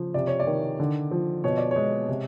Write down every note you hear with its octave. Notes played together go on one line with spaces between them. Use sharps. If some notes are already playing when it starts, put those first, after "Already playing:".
Already playing: C#3 F3
C3 D5
C#5
D5
D#3
D3
F3
B2 C#5
D5
C#5
G#3
C3